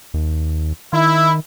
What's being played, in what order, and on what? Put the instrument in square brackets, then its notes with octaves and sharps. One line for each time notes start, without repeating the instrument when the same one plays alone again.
[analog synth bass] D#2
[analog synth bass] D#3 [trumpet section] E4